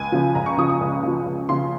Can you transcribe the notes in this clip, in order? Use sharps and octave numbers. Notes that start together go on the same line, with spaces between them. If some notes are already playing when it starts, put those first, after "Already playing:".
Already playing: C#2 G#5
C#3 F3
C#2 A#5
C#6
C#3 F3 D#6
D#6
C#2
C#3 F3
C#2
C#3 F3 C6